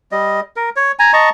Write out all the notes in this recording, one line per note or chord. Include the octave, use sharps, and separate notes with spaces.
G3 D#5
A#4
C#5
G#5 A#5
D#5 A5 A#5 C#6